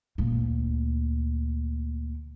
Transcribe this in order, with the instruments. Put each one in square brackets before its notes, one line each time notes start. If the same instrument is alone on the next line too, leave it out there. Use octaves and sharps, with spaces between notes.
[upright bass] D2 A#2